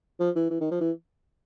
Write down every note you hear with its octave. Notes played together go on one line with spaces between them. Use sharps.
F3
E3
E3
D#3
F3
E3